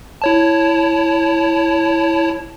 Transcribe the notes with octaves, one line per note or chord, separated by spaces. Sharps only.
E4 C#5 A5